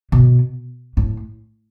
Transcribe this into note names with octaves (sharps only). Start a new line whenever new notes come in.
B2
A2